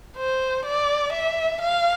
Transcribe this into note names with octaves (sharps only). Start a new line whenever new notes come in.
C5
D5
E5
F5